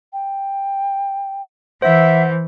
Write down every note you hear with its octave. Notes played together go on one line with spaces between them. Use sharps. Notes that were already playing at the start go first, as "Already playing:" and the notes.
G5
E3 C5 E5 F#5